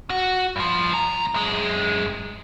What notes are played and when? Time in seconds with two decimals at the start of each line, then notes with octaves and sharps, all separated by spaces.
0.10 F#4
0.56 G2 F3
0.94 C2 A#5
1.34 F#2 G#3